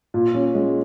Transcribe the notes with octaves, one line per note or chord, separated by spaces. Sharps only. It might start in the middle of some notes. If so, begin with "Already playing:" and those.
A#2
C#4
G#3